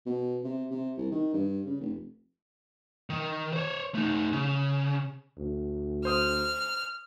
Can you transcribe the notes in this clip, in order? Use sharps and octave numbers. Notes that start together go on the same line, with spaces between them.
B2
C3
C3
C2
D#3
G2
C#3
F1
D#3
C5 C#5
A3 D#4
C#3
D2
C5 D#6 F6